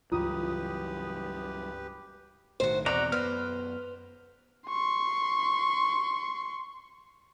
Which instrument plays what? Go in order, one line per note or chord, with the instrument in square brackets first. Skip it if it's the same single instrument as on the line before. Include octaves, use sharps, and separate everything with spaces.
[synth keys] C#2 D#6 [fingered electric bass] G2 E3 F#3 [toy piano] F4 [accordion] G4 B4
[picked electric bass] B1 A2 D#3 [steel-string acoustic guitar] F#4 C5
[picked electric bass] E2 B2 [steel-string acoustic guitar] C4 [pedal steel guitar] F#4 D5 A#5
[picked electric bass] F#2 B3 [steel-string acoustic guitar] B4 C5 [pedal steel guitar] F6
[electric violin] C6 C#6